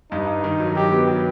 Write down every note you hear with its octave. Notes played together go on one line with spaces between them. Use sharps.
G2 D#4
G2
D#3
F#3
F#3 G4
B3
F#3